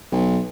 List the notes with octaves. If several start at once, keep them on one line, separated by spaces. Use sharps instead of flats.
B1